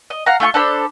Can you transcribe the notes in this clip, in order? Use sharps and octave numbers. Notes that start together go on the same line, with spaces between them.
D#5
F5 F#5 A#5
A3 F4 G5 C#6
D4 A4 C5 B5